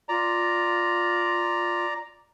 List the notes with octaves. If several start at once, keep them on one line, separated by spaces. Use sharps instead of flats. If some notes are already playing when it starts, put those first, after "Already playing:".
F4 D5 A#5